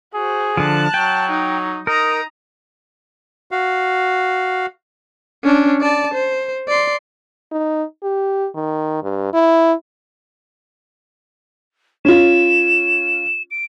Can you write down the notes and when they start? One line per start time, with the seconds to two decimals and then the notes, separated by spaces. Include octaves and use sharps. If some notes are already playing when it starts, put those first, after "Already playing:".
0.14 F#4 G#4 C5
0.57 D3 F3 A5 F#6
0.94 F#3 G5
1.31 D#4
1.87 D#4 A#4 A#5 D#6
3.51 F#4 F5
5.44 C#4 D4
5.81 D5 A5
6.14 C5
6.68 D5 C6
7.52 D#4
8.03 G4
8.55 D#3
9.03 G2
9.33 E4
12.05 C#4 F4 E7
13.51 D7